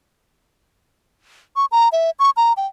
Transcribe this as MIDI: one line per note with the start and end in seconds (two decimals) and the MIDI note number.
1.56 1.66 85
1.72 1.89 82
1.92 2.10 76
2.19 2.30 85
2.37 2.53 82
2.57 2.67 79